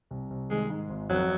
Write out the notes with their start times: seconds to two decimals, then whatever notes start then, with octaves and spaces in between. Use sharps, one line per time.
0.11 C2
0.30 C2
0.50 D#3 G#3
0.70 G#2
0.90 G#1
1.10 F2 F#3